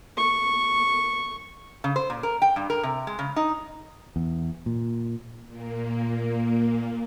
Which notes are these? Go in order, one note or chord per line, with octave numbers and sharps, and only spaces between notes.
C#6
C#3
C5
A#2
A#4
G5
G2
A#4
C3
G#3
C#3
D#4
E2
A#2
A#2 A#3